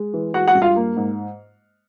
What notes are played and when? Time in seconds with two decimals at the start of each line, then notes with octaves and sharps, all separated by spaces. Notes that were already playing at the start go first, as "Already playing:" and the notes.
Already playing: G#3
0.14 E3
0.34 G#3 F#4 F#5
0.48 F#4 F#5
0.55 G2
0.62 F4 F5
0.76 A#3
0.96 G#2